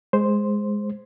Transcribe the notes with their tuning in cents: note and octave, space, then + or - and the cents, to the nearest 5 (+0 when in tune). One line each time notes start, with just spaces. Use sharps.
G#3 +0 C5 +0